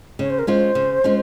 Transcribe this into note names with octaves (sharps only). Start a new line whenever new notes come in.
C#3 C#5
C5
A#4
G#3 C#4 F4 C5
C#3
G#3 C#4 F4